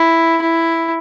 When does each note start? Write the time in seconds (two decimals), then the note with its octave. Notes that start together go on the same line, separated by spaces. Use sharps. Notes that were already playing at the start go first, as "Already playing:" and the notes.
Already playing: E4
0.42 E4